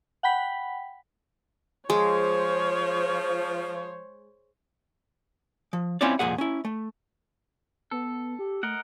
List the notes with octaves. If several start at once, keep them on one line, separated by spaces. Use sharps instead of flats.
F#5 G5 B5 B6
F3 G#3 C5 C#5
F3
C4 C#4 E4 F4 C#5 D5
C2 F2 A#2 G#4 F#5
C#4 E4
A3
B3 A4
G4
A3 A#4 D#5 F#5